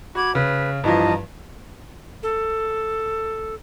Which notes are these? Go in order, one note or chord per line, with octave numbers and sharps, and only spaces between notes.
F#4 B5 D6 G#6
C#3 B4
G2 E3 F3 D#5 A5 A#5
A4